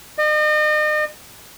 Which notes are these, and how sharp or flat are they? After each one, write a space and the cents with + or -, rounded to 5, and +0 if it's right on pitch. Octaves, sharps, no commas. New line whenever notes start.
D#5 -40